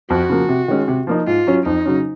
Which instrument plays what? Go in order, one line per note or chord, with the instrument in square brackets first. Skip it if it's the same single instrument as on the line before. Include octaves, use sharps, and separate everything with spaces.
[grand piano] F2 [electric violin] F#4
[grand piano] C#3 F3 A#3
C3
D#3 G#3 C#4
C3
F3 A#3 D#4
[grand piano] G#2 [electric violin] F4
[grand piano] F#3 C#4
[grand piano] F2 [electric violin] D#4
[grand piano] C#3 F#3 C#4